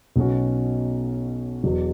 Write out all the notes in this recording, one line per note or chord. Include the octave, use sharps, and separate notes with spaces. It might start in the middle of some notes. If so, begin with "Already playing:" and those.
B1 B2 F#3 C#4 F#4
E1 E2 B2 F#3